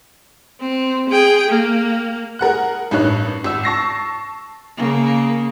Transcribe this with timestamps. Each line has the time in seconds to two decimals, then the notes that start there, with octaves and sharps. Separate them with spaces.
0.61 C4
1.09 G#4 G5
1.49 A#3
2.39 G#4 A#4 F#5 F#6
2.91 A1 G2 D#4 C#5 F#6
3.44 G#1 E6
3.64 A5 C#6 A#6 C7
4.77 C#3 A#3